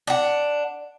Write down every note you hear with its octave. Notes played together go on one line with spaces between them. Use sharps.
D4 F#5